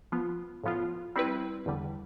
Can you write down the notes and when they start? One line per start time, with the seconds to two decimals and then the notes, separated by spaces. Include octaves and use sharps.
0.12 F3 B3 F4
0.64 A2 F3 B3 F4
1.16 G3 C4 E4 B4
1.66 E2 D3 G3